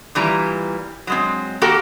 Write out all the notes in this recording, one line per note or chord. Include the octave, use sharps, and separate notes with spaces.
A#2 E3 G3 A#5
F#3 G#3 C4
A#3 F#4 G4 A4 A#4